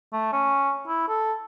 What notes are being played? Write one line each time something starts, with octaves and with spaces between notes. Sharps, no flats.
A3
C#4
E4
A4